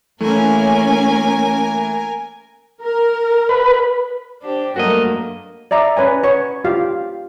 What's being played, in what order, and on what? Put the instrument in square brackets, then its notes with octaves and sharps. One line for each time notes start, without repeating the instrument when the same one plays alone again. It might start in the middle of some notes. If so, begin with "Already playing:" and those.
[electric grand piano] E3 A3 [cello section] A#3 C#4 [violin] A#4 G#5
[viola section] A#4
[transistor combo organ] B4
[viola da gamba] D4 G4 [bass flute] C5
[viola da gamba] G2 F#3 A3 [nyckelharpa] A#3 [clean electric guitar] F#4 D#5 [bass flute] A#4
[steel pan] D5 E5 A#5
C#4 B4 C#5 G#5
C#5 C#6
F4 G4 F5